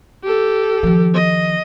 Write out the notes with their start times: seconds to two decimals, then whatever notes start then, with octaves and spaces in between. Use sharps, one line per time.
0.24 G4 A4
0.83 D#3 F3
1.14 D#5